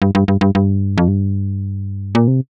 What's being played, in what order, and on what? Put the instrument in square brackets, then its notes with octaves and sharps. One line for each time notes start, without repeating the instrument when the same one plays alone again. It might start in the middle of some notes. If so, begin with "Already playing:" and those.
[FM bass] G2
G2
G2
G2
G2
F2
G2
A#2
C3